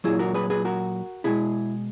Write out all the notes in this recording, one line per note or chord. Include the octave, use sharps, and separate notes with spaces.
A#2 F#3 E4 G#4
F#4 A#4
G#4 B4
G#4 B4
F#4 A#4
B2 G#3 E4 G#4